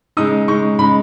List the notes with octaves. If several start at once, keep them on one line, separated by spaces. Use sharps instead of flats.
C#3 G#3 D#4 D#6
C#3 G#3 D#4 C#6
C#3 G#3 D#4 B5